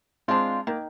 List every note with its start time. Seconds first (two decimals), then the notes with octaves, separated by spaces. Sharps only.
0.28 G#3 C4 D4 F4
0.67 D#3 A#3